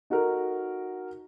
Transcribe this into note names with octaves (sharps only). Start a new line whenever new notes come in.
D#4 F#4 A4 A#4